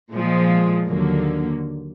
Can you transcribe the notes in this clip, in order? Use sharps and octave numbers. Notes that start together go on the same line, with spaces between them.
A#2 F3 G#3
D#2 D3 F#3 A#3